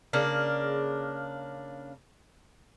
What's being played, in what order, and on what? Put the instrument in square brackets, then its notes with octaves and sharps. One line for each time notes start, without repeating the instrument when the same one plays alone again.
[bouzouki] C#3 A#3 D4